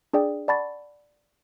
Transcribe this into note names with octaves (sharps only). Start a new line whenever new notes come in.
D4 G#4 D5 G5
D5 F#5 A5 B5 C#6 A6